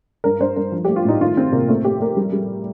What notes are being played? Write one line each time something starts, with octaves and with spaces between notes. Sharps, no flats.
G2 A#4
G2 C5
G2 A#4
F3
A3 G4
F4
A2 D#4
D#3 F4
D#3 C4
C3 A#3
A3 C4
A3 G4
A3 A#4
G3
G3